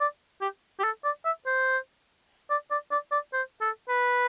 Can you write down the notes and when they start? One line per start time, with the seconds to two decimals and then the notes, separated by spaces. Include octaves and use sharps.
0.01 D5
0.41 G4
0.79 G4
0.84 A4
1.04 D5
1.25 E5
1.46 C5
2.50 D5
2.71 D5
2.92 D5
3.12 D5
3.33 C5
3.61 A4
3.89 B4